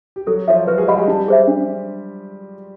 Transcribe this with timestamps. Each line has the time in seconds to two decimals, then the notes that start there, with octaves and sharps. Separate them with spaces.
0.16 G4
0.26 F#3 F#4 A4
0.48 F3 F4 C#5 E5
0.67 F#3 F#4 B4
0.77 G#3 G#4
0.88 G3 G4 D#5 F#5 B5
0.98 G#3 G#4
1.07 G3 D#4 G4
1.28 G#4 C5 E5
1.48 D4